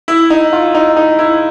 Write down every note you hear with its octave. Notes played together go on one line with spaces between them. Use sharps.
E4
D#4
F4
D#4
D#4
E4